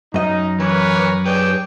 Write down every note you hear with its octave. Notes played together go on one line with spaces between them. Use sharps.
F#2 C#4 D#4 D#5
E3 A#4 B4 C#5
G#4 B4 C#5 D5 G5